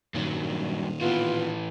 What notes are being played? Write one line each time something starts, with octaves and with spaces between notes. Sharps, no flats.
G2 A#2 D#3 F#3
A2 E3 B3 F4